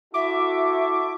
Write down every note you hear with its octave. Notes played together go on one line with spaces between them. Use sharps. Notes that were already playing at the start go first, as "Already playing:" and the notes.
E4 F#4 A4 E5 D6